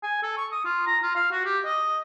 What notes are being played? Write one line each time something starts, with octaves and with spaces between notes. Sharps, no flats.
G#5
A4
C#6
D#6
F4
A#5
F4
F5
F#4
G4
D#5